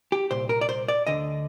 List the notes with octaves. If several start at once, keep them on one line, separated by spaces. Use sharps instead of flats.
G4
C2 A#2 C5
A#4
D5
C5
D5
D2 D3 D#5